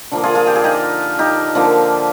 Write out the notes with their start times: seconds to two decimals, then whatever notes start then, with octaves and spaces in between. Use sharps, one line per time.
0.12 D3 F3 A#3
0.24 F4 G#4
0.35 F4 G#4
0.47 G4
0.55 G#4
0.64 D#4 G4
1.19 D#4 G4
1.55 D3 F3 A#3